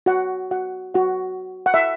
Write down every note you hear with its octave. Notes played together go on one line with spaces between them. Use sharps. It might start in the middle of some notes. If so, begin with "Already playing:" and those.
F#4 F#5
F#4 F#5
F#4 F#5
F#5
E5